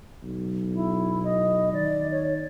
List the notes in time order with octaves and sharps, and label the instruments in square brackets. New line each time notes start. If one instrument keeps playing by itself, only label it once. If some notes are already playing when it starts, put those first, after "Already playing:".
[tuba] B1
[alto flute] E4
D#5
[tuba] D#3 [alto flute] D5
[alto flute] C#5